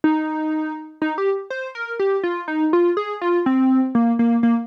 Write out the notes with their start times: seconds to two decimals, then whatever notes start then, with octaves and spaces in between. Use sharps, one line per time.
0.04 D#4
1.02 D#4
1.18 G4
1.50 C5
1.75 A#4
1.99 G4
2.23 F4
2.48 D#4
2.73 F4
2.97 G#4
3.21 F4
3.46 C4
3.95 A#3
4.19 A#3
4.43 A#3